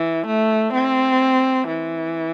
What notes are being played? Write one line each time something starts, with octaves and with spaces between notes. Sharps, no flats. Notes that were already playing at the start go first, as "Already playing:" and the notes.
Already playing: E3
A3
C4
E3